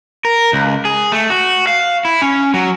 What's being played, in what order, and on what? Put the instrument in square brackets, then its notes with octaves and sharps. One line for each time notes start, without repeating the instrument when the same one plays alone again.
[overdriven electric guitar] A#4
C#2
G#4
A3
F#4
F5
E4
C#4
F#3